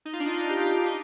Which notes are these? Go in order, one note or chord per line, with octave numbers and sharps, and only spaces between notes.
D#4
F4
D4
D#4
F4
G4
F4
G4
D#4